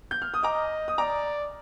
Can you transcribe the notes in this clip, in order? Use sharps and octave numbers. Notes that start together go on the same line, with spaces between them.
G6
F6
D#6
D#5 A#5 D6
D#6
D5 A#5 D6